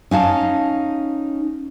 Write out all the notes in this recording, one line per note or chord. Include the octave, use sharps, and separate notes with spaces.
C#4 D#4 F5 A5